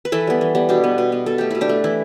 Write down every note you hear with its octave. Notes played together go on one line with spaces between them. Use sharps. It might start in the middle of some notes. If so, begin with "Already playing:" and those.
B4
E3 E4 A4
G3 B3
E3
G3 B3
B2 D4 G4
B3
B2
B3
B2 A4
A3 G4
B2 E4
D4 G4
A3
E3 E4